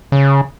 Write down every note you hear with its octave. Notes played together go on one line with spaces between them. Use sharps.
C#3